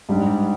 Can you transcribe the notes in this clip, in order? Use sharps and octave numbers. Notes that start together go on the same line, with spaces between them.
G#2 G3 D4